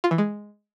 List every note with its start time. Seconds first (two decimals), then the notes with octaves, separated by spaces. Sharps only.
0.04 F4
0.11 E3
0.18 G#3